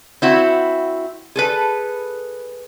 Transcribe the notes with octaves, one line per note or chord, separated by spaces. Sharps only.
C4 E4 F#4
G#4 A4 B4